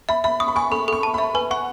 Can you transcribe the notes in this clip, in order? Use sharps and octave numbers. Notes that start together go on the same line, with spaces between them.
E5 B5
E5 B5
C#6 D#6
B5
G#5 C#6
A4 B5
A4 C#6
A5
B5
E5
B4 G#5
F#5 C#6